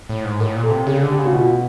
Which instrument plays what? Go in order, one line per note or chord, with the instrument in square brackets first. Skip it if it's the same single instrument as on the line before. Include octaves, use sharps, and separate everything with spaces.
[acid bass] A2
G#2
[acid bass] A2 [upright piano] A#4
[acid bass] A#2
[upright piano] A4
[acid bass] C3
[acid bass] C#3 [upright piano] G#4
[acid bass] D3
[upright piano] G4
[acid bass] C#3
[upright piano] F#4
[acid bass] B2 [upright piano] F4